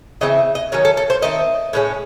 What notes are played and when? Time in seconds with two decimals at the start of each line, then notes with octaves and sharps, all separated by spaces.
0.21 C#3 E3 A3 C4 D#5
0.55 D#5
0.72 D#3 F#3 C#4 C#5
0.85 A4
0.97 A4
1.10 C5
1.22 D#3 A3 C4 D#5
1.73 A2 G#3 C#4